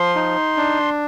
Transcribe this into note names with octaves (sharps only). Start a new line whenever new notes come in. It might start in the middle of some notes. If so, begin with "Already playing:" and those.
Already playing: F3 C6
D#4
D4